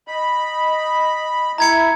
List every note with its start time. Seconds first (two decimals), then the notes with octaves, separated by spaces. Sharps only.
0.07 D#5 B5
1.58 E4 A#5 G#6 C#7